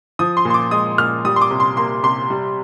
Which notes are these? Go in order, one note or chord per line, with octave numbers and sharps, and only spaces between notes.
F3 D#6
C6
A#2
C6
D6
G#3 D#6
A#2 F6
G3 D#6
C6
D6
C3
C6
A#3 C6
C3 C6
G3